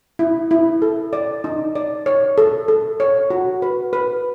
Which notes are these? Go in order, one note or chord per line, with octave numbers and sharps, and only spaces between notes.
E4
E4
A4
D5
D#4
D5
C#5
A4
A4
C#5
F#4
B4
B4